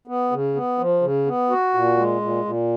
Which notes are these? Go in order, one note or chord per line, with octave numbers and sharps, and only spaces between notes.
B3
C#3
B3
F3
C#3
B3
F#4
A#2
G#3
A#2
A#2